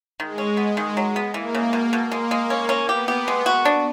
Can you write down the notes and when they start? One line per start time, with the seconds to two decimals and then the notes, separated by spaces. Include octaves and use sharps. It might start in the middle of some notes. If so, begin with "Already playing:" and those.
0.20 D#3 G#3
0.38 C#4
0.57 B3
0.77 D#3
0.97 F#3
1.16 B3
1.34 E3 A#3
1.55 C#3
1.73 B2
1.93 B2
2.11 G#3 A#3
2.31 G#3
2.50 C#4
2.69 C#4
2.89 B3 G4
3.08 G4
3.28 G#3
3.46 F#4
3.65 D4